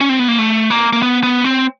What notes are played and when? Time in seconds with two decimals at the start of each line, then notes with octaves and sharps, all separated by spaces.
0.01 C#4
0.09 C4
0.19 B3
0.28 A#3
0.38 A3
0.70 A#3
0.93 A#3
1.02 B3
1.23 B3
1.44 C4